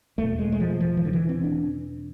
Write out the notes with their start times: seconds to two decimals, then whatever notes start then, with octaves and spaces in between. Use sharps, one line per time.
0.18 E2 B2 A3
0.39 G#3
0.52 G#3
0.60 F3
0.80 F3
0.97 E3
1.05 D3
1.13 E3
1.29 C4
1.44 D4